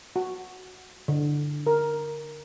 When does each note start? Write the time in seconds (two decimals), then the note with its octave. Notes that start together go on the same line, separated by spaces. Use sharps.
0.16 F#4
1.08 D3
1.67 A#4